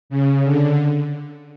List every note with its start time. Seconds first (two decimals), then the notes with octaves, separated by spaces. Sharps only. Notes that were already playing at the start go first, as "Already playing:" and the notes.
0.09 C#3
0.44 D3